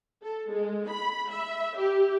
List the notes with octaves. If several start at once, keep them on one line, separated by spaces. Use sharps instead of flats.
A4
G#3
B5
E5
G4